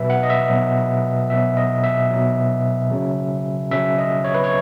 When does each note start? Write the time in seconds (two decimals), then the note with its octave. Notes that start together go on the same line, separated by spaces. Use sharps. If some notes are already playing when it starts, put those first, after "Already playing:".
Already playing: B2 F#3 B4 E5
0.10 F#5
0.23 D#5
0.30 E5
0.50 B2 F#3
1.30 B2 F#3 E5
1.57 D#5
1.84 E5
2.11 B2 F#3
2.91 C#3 F#3
3.71 C#3 F#3 E5
3.98 D#5
4.24 C#5
4.34 B4
4.44 C#5